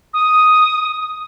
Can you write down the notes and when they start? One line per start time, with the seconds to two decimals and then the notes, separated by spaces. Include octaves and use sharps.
0.14 D#6